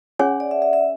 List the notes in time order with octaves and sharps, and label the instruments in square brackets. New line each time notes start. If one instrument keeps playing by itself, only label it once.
[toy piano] C#4 G#4 C#5 G#5 [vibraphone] F#5
[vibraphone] D5
E5
E5
E5